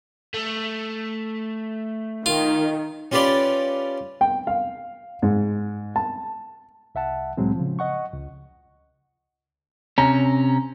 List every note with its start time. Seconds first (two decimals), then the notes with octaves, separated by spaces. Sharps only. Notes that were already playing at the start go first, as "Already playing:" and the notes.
0.34 A3
2.26 D#3 F4
3.12 C#4 F4 G4 B4 D5 C6
4.21 G5
4.47 F5
5.22 G#2
5.96 A5
6.95 C2 E5 F#5 A5
7.37 C2 A2 F#3 G#3 C4
7.55 C#3 F3
7.79 D#5 F#5 C#6
8.13 C#2
9.98 C3 C#4 A#5